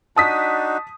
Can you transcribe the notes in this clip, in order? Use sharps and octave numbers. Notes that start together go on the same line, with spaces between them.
D4 D#4 F#4 A5 D#6 B6